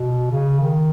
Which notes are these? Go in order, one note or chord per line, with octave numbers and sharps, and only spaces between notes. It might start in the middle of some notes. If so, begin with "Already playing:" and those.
Already playing: B2
C#3
D#3